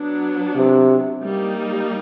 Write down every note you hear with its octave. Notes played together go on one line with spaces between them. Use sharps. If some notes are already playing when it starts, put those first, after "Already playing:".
Already playing: F#3 B3 D4
C3
G3 A#3 D#4